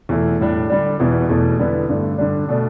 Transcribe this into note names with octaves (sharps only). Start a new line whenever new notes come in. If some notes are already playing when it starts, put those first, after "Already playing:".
E2 B2 A3 E4
A2 G3 D4
D3 G3 D4
E2 B2 B3 E4
E2 B2 A3 E4
D3 G3 B3 E4
G2 D3 A3
G2 D3 G3 D4
B2 A3 D4